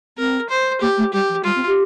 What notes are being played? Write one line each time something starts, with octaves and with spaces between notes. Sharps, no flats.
C4 A#4
C5
A#3 G4
A3
G3 G4
F3
G3 F4
C4
G4